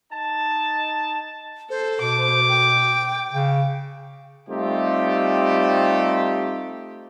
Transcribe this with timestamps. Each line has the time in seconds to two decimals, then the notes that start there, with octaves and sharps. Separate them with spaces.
0.11 D#4 A5
1.70 A4 C5
2.01 B2 D6
2.49 G5
3.32 C#3
4.49 G3 A3 C4 D#4 F4 G4